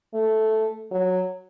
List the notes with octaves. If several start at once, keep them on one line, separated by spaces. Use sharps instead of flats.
A3
F#3